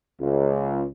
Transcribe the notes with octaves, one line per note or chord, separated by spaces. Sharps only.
C#2